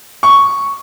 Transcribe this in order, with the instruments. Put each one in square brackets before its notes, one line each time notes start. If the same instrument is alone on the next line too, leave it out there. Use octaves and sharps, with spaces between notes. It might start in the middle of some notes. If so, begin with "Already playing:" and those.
[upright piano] C#6